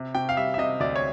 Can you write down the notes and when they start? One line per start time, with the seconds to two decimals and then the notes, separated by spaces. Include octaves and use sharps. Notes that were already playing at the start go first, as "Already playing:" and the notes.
Already playing: C3
0.15 C3 G5
0.29 F5
0.37 G3 E5
0.54 E5
0.58 C3 D#5
0.80 D2 D5
0.96 C#5